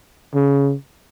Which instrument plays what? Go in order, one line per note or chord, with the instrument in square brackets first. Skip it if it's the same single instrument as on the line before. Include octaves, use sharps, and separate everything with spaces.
[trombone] C#3